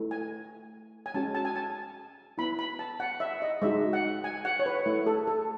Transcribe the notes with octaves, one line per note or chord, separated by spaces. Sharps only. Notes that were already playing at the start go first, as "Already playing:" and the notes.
Already playing: A3 E4
G#5
G#5
G#3 C#4 F#4 A5
A5
G#5
A5
B3 E4 B5
B5
A5
F#5
E5
D#5
G#3 D#4 F#4 E5
F#5
G#5
F#5
C#5
B4
A3 E4
A4
A4